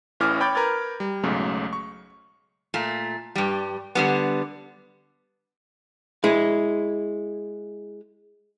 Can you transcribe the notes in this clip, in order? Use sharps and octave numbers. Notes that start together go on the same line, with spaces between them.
A1 A2 E3 C#4 D6 F6
C#5 G5 B5 D6 G6 A6
A#4 B4 D6 F6 G#6 A6
G3
B1 G#2 C#3 F#3 G#3 A3
C#6
A#2 A3
G2 G3
D3 G3 B3
G#3 E4